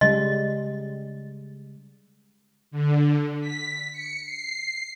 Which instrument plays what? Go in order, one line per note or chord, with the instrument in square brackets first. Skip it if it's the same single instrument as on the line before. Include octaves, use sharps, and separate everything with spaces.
[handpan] C#3 G3 G#3 [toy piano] D#5
[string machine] D3
B6
C#7
C7